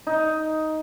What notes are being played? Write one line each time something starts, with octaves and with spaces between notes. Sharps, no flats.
D#4